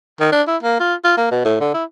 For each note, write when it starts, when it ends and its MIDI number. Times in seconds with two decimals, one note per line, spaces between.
0.20 0.29 51
0.32 0.42 62
0.48 0.57 64
0.63 0.80 58
0.80 0.95 65
1.05 1.13 65
1.17 1.30 58
1.31 1.44 47
1.45 1.56 45
1.61 1.73 50
1.74 1.84 64